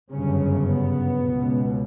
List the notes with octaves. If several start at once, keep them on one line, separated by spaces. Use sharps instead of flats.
G1 F#2 C#3 C#4
B3
C#2 B2